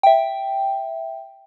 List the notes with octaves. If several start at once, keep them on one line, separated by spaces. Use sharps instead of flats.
E5 G5